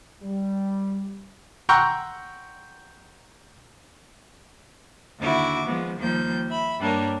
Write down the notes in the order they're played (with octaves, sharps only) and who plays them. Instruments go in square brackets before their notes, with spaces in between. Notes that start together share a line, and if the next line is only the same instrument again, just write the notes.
[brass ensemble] G3
[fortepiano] F#5 G5 A#5 C6 C#6 E6
[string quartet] D#2 D3 E4 F#4 C#6 D6
F3 G#3 B3
D#2 F3 G3 A#3 G6
E5 B5
G2 G3 A#3 D4 A#4 C#5